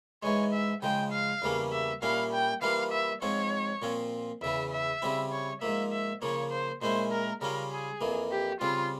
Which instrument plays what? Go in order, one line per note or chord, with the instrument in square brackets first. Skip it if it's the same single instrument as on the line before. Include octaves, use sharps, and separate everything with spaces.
[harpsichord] G#2 E3 G#3 [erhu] C#5
[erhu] E5
[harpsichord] C#3 F3 G#3 [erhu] G5
[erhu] F5
[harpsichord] E2 C#3 G3 A#3 C#4
[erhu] E5
[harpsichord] A#2 G3 C#4 E4 [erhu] F5
[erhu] G5
[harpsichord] E3 G3 A#3 F4 [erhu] F5
[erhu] E5
[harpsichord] G#2 F3 C4 F4 [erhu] C#5
[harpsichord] A#2 F3 C4 F4
[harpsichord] E2 C#3 E3 [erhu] E5
[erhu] E5
[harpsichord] C#3 G3 C4 E4
[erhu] C#5
[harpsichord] G#2 F3 A#3 [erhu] E5
[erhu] E5
[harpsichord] C#3 F3 A#3 [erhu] C#5
[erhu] C5
[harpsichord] A#2 G#3 C#4 E4 [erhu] C5
[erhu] A#4
[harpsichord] C#3 G3 C#4 F4 [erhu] A#4
[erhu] G#4
[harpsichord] F2 E3 A#3
[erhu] G4
[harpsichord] C#3 G3 C4 [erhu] F4